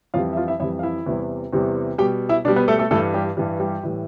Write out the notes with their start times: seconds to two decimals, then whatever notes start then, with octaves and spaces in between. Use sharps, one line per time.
0.14 F2 E3 G3 F4 F5
0.33 E5
0.37 F4 F5
0.48 E4 E5
0.60 F2 E3 G3 E4 E5
0.79 F5
0.83 E4 E5
1.06 E2 C3 E3 G3
1.53 E2 C3 E3 G3
1.98 B2 G3 G4 G5
2.29 E4 E5
2.45 B2 D4 D5
2.48 G3
2.56 B3 B4
2.68 A3 A4
2.79 A3 A4
2.91 G2 E3 G3 A3 A4
3.14 G3 G4
3.37 G2 E3 G3
3.60 G3 G4
3.83 A2 E3 G3